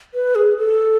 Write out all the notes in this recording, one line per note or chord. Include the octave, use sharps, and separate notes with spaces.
B4
G#4
A4